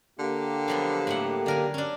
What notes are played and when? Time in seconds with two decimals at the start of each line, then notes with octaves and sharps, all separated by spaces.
0.19 D3 A#3 G4
0.68 F3 F#3 B3
1.07 A2 A3 F#5
1.46 D3 A#4 G#5
1.74 C#4 D4